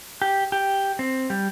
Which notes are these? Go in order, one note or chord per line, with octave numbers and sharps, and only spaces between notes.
G4
G4
C4
G3